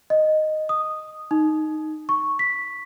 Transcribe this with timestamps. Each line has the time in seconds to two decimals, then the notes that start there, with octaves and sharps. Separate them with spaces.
0.10 D#5
0.69 D#6
1.31 D#4
2.09 C#6
2.39 B6